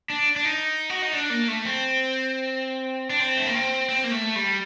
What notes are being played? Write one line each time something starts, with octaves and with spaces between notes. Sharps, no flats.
D4
D4
D#4
F#4
D#4
D4
A#3
A3
C4
D4
C4
A3
A#3
C4
C4
A#3
A3
G3